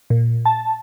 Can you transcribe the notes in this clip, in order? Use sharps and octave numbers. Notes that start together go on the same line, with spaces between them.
A#2
A5